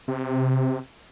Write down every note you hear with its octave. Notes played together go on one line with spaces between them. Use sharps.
C3